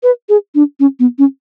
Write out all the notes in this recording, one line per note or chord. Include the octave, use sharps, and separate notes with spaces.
B4
G#4
D4
C#4
B3
C#4